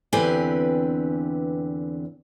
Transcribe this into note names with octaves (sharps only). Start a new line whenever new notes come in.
E2 D3 C4 G4 B4 G#5